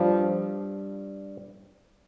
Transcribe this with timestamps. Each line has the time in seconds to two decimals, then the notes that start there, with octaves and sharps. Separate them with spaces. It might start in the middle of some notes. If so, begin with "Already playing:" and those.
Already playing: G2 F3 G3